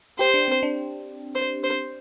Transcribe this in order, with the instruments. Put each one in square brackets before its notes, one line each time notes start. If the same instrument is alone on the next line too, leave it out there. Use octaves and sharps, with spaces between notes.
[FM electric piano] G4 [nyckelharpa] C5
[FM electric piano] D4
C4
D4
[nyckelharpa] C5
C5